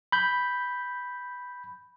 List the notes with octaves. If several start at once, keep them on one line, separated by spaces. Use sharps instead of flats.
B5 G6